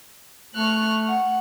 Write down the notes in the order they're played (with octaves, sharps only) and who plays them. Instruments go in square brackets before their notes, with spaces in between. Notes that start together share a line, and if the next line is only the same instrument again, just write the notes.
[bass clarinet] A3 [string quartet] C#6 F6 F#6
[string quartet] F#5